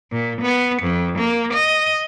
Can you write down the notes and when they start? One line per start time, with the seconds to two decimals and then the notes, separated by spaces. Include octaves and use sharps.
0.12 A#2
0.42 B3
0.82 F2
1.18 A#3
1.54 D#5